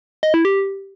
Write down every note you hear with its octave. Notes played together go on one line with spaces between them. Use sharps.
D#5
E4
G4